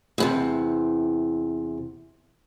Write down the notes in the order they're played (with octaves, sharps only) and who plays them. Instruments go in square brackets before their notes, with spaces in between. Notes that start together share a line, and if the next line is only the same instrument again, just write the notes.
[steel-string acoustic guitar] E2 A2 C3